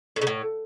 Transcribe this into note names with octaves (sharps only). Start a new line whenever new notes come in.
A2
C#3
A2